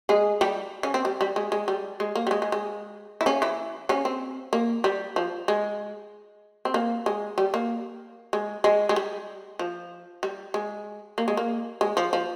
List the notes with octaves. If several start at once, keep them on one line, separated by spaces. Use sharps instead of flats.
G#3 G#4
G3 G4
C#3 C#4
C4
G3
G3
G#3
G#3
G3
G#3
A#3
G3
G#3
G#3
G#3
E4
C#3 C#4
E3 E4
C#3 C#4
C4
A#3
G3
F3
G#3
C4
A#3
G#3
G3
A#3
G#3
G#3
G#3
G3
F3
G3
G#3
A#3
G#3
A#3
G#3
F3
F3